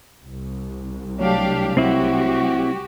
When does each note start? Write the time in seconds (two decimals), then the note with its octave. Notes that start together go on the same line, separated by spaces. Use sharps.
0.23 C2
1.19 F#3 A3 D4 G4 C#5 F5
1.77 C4 E4 F#4 G4